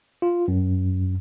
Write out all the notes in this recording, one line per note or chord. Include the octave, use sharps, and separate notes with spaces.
F4
F#2